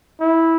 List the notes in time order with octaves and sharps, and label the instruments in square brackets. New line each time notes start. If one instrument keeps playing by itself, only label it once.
[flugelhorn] E4